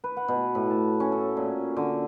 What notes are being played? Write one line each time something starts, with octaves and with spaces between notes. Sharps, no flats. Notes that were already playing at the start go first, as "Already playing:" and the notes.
B4
F#5
B2
A2
A5
C#4
A4
A#2
D3